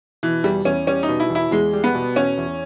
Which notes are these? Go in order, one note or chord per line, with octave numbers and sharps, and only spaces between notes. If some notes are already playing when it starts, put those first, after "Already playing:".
B2 E3
E2 G3
E2 C#4
G3 C#4
D#4
B2
E4
E2
E4
E2 G#3
G3
B3
B2
E2 C#4
E2